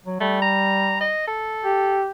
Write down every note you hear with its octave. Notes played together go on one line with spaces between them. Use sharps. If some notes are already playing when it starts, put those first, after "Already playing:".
F#3
G3 A3
A#5
D#5
A4
G4